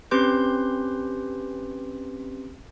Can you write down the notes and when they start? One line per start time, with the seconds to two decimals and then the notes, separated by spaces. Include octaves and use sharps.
0.11 C4 C#4 G4 B4 C6 G6